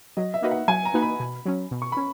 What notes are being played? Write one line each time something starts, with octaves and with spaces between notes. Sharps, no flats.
F#3 D#5
E5
A#3 D#4 F#4 B4
F#5
F#3 G#5
A#5
A#3 D#4 F#4 B4
B5
B2
F#3 C#4
B2
C#6
C#4 B5